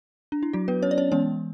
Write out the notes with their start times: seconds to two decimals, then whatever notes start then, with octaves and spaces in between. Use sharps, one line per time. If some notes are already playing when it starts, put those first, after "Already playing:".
0.32 D4
0.43 E4
0.53 F#3 F#4
0.68 B3 B4
0.83 C#4 C#5
0.91 D5
0.98 C#4 C#5
1.12 E3 G#3 B3 C#4 C#5